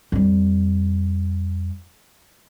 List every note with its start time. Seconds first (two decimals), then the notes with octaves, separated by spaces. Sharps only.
0.12 F2 G3